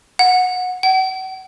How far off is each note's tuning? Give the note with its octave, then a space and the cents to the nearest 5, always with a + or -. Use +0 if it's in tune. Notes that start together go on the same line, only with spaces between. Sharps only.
F#5 -15
F#5 +40